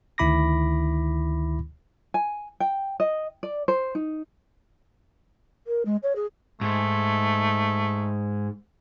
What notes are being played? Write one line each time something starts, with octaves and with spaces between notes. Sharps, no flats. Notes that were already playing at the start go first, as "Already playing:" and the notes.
D2 D#3 E4 B5 D6 A#6
G#5
G5
D#5
D5
C5
D#4
A#4
G#3
C#5
G#4
G#2 A3